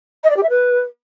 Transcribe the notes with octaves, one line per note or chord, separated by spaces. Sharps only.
D#5
D5
G4
E5
B4